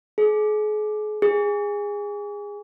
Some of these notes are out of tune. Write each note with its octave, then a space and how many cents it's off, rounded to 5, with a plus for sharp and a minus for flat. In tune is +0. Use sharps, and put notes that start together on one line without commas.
G#4 +40
G#4 -20